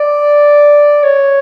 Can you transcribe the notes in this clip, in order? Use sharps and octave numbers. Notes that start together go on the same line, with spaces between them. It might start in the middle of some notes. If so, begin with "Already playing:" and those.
Already playing: D5
C#5